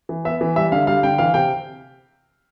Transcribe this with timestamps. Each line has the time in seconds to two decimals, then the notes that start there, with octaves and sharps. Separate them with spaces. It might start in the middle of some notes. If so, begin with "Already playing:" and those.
0.09 E3
0.25 B3 E5
0.41 E3
0.56 G3 E5
0.72 D3 F5
0.87 G3 F5
1.03 D3 G5
1.18 E3 F5
1.34 C3 G5